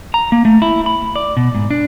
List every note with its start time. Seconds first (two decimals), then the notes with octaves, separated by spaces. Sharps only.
0.14 A#5
0.32 A#3
0.45 A3
0.62 E4
0.86 B5
1.16 D5
1.37 B2
1.55 G#2
1.71 D4